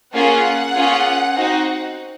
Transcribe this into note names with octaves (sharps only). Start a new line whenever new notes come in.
A#3 C#4 F4 G#4 F#5
A#3 C#4 F4 G#4
C4 D#4 F#4